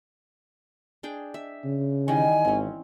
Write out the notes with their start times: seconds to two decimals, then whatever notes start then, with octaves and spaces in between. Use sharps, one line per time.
1.03 D4 G#4 G5
1.34 E5
1.65 C#3
2.08 D#3 E3 G3 G#5
2.45 G#1 C4 C#4